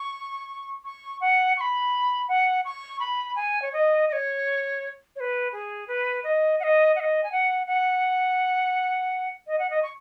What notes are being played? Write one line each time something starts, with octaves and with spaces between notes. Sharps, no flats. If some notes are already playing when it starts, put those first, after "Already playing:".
Already playing: C#6
C#6
F#5
C#6
B5
F#5
C#6
B5
G#5
C#5
D#5
D#5
C#5
C#5
B4
G#4
B4
D#5
F#5
D#5
F#5
D#5
G#5
F#5
F#5
D#5
F#5
D#5
C#6